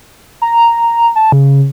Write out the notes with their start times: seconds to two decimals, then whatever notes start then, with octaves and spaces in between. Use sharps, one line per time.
0.42 A#5
1.16 A5
1.32 C#3